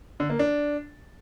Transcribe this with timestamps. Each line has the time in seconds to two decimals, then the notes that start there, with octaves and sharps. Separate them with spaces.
0.20 D3
0.30 A#3
0.39 D4